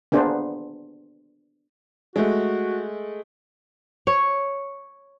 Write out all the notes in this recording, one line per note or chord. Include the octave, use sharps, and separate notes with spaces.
A#3 B3 D4 G#4 C5
G#3 A3 F#4
C#5